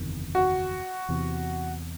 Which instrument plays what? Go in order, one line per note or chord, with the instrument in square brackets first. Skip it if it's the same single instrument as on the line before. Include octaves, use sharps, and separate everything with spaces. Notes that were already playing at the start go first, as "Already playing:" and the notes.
Already playing: [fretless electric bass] F#1 E2 C3 D#3
[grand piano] F#4
[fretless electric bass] E2 C3 E3